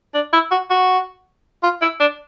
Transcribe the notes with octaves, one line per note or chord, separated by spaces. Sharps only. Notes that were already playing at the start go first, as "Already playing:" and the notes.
D4
E4
F#4
F#4
F4
E4
D4